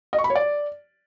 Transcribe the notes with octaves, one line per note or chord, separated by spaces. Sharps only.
D#5
C#6
B5
C#5
D5